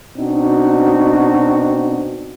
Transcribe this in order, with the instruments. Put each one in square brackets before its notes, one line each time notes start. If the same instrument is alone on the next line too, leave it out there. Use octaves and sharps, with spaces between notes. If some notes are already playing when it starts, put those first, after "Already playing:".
[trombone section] B2 C4 D4 D#4 F#4